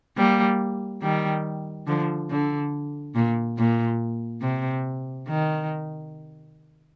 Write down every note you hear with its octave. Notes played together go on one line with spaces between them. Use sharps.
G3 A#3
D#3 G3
D3 F3
D3
A#2
A#2
C3
D#3